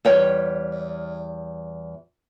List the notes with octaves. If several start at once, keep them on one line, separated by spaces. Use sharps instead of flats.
E2 G3 C#5 G5